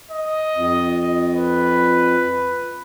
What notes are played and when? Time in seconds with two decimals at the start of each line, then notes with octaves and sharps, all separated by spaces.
0.11 D#5
0.56 F2
1.35 B4